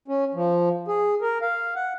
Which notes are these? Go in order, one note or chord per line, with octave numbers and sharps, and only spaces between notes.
C#4
F3
G#4
A#4
F5
F#5